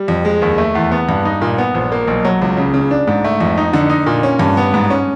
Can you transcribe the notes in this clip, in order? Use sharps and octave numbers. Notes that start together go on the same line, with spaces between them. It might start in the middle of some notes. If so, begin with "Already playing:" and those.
Already playing: G3
F2
G#3
D#2
A3
E2
B3
G2
D#4
A#2
B3
A#1
A#3
B1
F#3
C#2
C#3
C#3
D4
G#2
A3
F2
D#4
D3
D#4
A#2
C#4
G2
B3
G#2
C#4